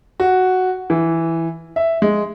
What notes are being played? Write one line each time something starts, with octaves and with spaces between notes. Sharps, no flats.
F#4
E3
E5
G#3